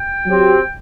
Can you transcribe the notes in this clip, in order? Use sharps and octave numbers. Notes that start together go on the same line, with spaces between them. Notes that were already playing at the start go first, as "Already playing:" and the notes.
Already playing: G5
F#3 C4 G4